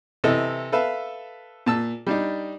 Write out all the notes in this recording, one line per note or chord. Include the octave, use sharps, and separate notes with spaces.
C3 E3 A4 D#5 A5
A4 B4 E5 F5
A#2 A5 E6
G3 D4 D#4